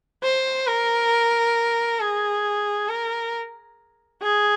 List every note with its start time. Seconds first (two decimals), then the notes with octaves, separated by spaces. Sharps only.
0.23 C5
0.67 A#4
1.99 G#4
2.88 A#4
4.22 G#4